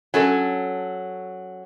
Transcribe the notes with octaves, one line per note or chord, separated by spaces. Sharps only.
F#3 C#4 A4